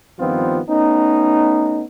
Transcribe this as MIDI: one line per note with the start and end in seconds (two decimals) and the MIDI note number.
0.20 0.60 43
0.20 0.60 51
0.20 0.60 53
0.20 0.60 59
0.20 0.60 60
0.20 0.60 65
0.70 1.84 57
0.70 1.84 59
0.70 1.84 61
0.70 1.84 63